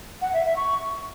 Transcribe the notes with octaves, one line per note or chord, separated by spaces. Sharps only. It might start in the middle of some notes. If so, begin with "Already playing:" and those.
F#5
E5
E5
C#6